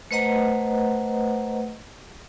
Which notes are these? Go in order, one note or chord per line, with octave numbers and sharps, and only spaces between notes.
A3 B4 C5 D#5 F#5 A#5